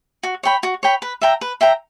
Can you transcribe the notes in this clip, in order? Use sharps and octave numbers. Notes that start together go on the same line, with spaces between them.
F#4
C#5 G5 B5
F#4
C#5 G5 B5
B4
E5 G5 A#5
B4
E5 G5 A#5